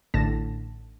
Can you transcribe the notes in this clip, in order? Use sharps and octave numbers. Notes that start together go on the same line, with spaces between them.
A1 A2 D3 A5 A#6 E7